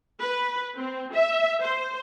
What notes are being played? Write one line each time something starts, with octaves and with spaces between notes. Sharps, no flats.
B4
C4
E5
C5